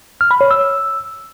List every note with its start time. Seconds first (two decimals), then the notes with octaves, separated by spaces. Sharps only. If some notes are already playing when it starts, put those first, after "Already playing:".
0.21 F6
0.31 B5
0.41 C#5
0.51 E6